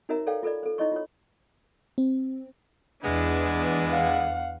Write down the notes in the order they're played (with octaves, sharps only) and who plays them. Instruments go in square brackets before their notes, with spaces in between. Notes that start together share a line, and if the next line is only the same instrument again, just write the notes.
[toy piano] D#4 F#4 A#4 C#5 E5 A#5
A4 C#5 D5 F5 G5
F4 A4 B4 D5
A4 C5
D#4 E4 C#5 D#5 C6 C#6
F4 C#5
[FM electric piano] C4
[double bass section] E2 [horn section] G#3 B3 E4 [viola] D4
[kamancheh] F5 F#5